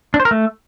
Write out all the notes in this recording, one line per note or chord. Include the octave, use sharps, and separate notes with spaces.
D4
C5
A#4
A3